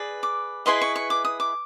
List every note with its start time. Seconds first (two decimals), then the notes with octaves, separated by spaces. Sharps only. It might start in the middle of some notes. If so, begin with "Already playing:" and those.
Already playing: G#4 B4 D5
0.23 D6
0.66 E4 G#4 B4 D#5 C6
0.81 C#6
0.96 C#6
1.10 D6
1.25 D#6
1.40 D6